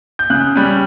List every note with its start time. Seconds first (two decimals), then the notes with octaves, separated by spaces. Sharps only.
0.19 G6
0.30 C#3 F#6
0.56 G3 C#4